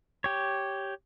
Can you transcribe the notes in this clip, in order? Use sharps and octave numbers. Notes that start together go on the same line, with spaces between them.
G4 C#5